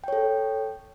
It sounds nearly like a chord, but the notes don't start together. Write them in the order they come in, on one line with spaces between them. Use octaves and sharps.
G5 C#5 A4